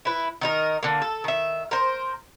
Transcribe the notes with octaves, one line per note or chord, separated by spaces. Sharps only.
E4 B4
D#3 D#4 A#4
D3 A#3
A4
D#3 E5
A#4 C5